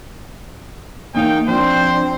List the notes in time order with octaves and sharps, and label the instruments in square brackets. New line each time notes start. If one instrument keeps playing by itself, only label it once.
[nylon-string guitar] E2 D#4 F5 [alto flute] A#3 [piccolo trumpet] G5
[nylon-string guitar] F3 [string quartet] C4 [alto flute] D4 [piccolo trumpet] C5